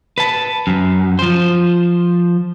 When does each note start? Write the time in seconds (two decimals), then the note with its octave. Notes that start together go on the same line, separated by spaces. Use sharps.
0.18 B4 A5
0.67 F#2
1.19 F3 C5